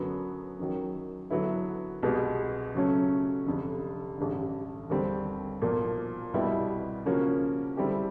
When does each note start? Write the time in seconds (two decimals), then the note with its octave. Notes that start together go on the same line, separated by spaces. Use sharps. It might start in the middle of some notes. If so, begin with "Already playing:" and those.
Already playing: F#2 D3 F#3 B3
0.59 F#2 D#3 F#3
1.30 D3 F#3 B3 E4
2.03 C2 B2 G#3 B3
2.75 C#3 F#3 A3 C#4
3.46 F1 F2 D3
4.18 A1 G2 D3
4.90 D#2 D3 G3 C4
5.62 B1 A#2 F3 A#3
6.33 C2 B2 G3 B3 E4
7.05 C#3 F3 A#3 C#4 F#4
7.77 D3 G3 C4 E4 G4